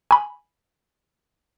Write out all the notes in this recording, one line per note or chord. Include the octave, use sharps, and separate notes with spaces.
G#5 B5